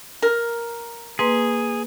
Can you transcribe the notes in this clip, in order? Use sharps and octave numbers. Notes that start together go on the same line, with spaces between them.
A#4
A#3 G#4 B4 C6